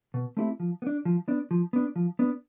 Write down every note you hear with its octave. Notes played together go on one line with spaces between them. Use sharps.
B2
A3 C4 E4 G4
F3
B3
D4
F3
B3 D4
F3
B3 D4
F3
B3 D4